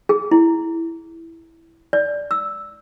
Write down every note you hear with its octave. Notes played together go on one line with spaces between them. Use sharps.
G#4
E4
D5
E6